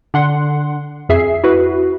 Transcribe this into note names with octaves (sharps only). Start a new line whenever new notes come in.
D3 F#5 C6
F2 G#4 E5 C7
E4 F#4 B4